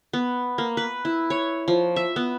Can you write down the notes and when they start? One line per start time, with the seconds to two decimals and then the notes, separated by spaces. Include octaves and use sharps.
0.13 B3
0.58 A#3
0.77 B4
1.05 E4
1.30 C#5
1.68 F3
1.96 E5
2.16 B3